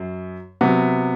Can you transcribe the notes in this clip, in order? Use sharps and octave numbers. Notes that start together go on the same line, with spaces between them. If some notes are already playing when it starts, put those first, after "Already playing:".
Already playing: F#2
C3 F#3 B3